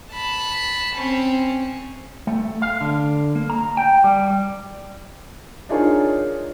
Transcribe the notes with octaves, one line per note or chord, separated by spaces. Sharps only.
A5 B5
C4 C#4
A3
F5
D3
A#3
A#5
G5
G3
D4 D#4 F4 G#4 A#4 C#5